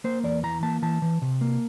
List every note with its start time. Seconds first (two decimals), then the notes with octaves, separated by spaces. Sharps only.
0.04 A#3 C5
0.24 E2 D5
0.43 E3 A#5
0.63 A#3 A5
0.82 E3 A5
1.02 E3
1.22 C3
1.41 A#3